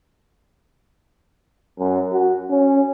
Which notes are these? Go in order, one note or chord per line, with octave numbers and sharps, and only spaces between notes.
F#2
F#4
C#4